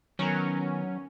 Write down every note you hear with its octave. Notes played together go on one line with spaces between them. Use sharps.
D#3 F#3 B3 C#4 A#4